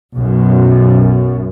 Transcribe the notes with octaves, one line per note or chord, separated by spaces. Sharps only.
B1 F#2